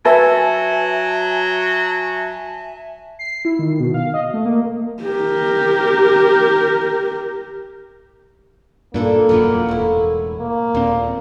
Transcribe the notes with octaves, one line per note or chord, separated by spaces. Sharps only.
F#3 B4 E5 G#5 A5
C7
E4
D#3
B2
F5
D#5
A3
A#3
G4 A#4
G2 A#2 A#3 D4 E4 A4
E1 F#2 A#2 B3 A#4 G5
E1 A2 E4
A#3
D#1 A#2 C4